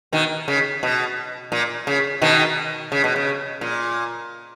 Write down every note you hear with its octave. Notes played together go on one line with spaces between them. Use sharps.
B2 D#3
C#3
B2
A#2
C#3
B2 D#3
C#3
B2
C#3
A#2